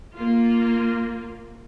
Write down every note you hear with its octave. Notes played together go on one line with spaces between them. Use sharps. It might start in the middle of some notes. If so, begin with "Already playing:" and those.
A#3 F4